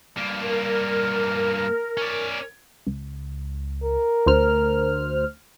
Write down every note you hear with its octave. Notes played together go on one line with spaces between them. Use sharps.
G2 A#3
A#4
C#4 D5
C#2
A#4
D2 C5 F6